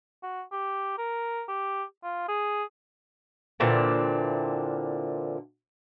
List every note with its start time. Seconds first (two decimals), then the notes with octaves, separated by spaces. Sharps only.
0.23 F#4
0.52 G4
0.98 A#4
1.48 G4
2.04 F4
2.28 G#4
3.60 A#2 D3 E3 C4